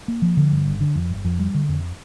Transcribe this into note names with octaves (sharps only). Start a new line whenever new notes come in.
A#3
F3
D3
G2
G1
D3
F2
G1
F2
G3
D3
F2